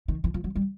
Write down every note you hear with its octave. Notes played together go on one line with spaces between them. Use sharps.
D#3
E3
F3
F#3
G3